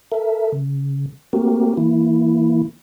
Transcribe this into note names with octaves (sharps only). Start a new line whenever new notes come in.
A4 A#4 E5
C#3
A3 A#3 C4 F#4 G4 A#4
E3 A#3 E4